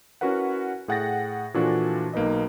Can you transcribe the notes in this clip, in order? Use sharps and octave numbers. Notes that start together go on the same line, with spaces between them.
C#4 E4 F#4 A#4 B4 F#5
A2 G#4 F#5 G5 A6 A#6
A#2 E3 F3 D4 F#4 A4
B1 A#3 D#4 B4 D#5